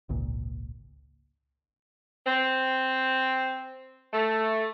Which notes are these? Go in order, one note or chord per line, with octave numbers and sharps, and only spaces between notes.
G#1 C#2 A#2
C4
A3